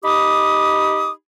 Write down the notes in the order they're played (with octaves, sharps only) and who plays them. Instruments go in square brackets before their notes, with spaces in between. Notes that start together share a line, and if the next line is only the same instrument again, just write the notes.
[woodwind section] D#4 G4 B5 D6 D#6